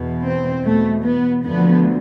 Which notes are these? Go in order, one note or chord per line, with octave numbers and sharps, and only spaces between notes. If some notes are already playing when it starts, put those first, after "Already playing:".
Already playing: E2 B2
C4
E2 B2 A3
B3
D2 D3 F3 B3